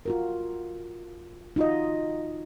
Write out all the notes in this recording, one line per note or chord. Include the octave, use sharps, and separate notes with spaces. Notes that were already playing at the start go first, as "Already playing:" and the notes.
F4 F#4 A#4
D#4 F4 F#4 D#5